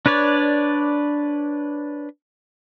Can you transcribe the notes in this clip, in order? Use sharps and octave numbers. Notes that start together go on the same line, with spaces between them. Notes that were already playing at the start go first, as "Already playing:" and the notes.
D4 B4 C#5 D5